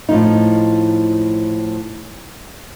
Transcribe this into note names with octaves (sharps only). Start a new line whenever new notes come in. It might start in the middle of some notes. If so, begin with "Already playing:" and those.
A2 F3 D#4